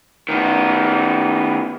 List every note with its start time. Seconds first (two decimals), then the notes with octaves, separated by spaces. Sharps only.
0.29 D#3 B3